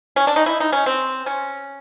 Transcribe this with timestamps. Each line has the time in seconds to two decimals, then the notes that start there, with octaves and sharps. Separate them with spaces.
0.16 C#4
0.27 D4
0.36 D#4
0.46 E4
0.60 D#4
0.72 C#4
0.86 C4
1.26 C#4